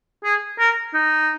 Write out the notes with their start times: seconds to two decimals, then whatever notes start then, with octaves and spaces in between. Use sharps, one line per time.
0.24 G#4
0.59 A#4
0.94 D#4